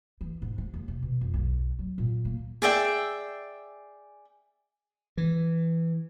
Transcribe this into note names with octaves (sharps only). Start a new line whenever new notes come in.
E3
G#2
G#3
D#2
C3
B2
F2
B1
F#3
A#2
A#3
G#4 D5 E5 G5
E3